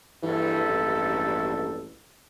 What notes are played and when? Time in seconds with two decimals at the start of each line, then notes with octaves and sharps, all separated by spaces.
0.23 A#1 G2 E3 A4
0.68 A1